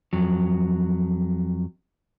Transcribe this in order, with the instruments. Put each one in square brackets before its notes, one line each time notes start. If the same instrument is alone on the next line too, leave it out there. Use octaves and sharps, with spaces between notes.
[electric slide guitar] F2 F#3